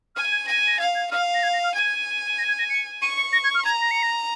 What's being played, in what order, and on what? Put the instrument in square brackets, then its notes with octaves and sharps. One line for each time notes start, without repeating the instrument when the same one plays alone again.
[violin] G#5 [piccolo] F6
[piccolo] G#6
[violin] G#5 [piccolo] A#6
[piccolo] A#6
[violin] F5 [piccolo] G#6
[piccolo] G#6
[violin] F5 [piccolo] F6
[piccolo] A#6
G#6
A#6
F6
[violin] G#5 [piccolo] G#6
[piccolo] A#6
G#6
A#6
C#7
[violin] C#6 [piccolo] D#7
[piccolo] C#7
A#6
G#6
F6
[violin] A#5 [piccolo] G#6
[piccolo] A#6
C#7
A#6